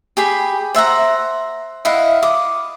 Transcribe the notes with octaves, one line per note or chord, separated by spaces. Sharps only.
G4 G#4 B5
C5 E5 F#5 A#5
E4 D#5 F5 F#5
D6 D#6